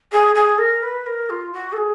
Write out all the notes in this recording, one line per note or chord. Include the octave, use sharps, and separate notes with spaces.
G#4
G#4
A#4
B4
A#4
F4
F#4
A4
G#4